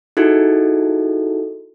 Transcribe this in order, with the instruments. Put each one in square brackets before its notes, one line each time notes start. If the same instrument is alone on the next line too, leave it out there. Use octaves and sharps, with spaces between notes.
[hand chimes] D#4 E4 F#4 G#4 A4